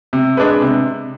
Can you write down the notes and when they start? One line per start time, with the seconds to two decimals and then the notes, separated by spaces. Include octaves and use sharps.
0.13 C3
0.37 G#3 D4 G#4 B4
0.62 C3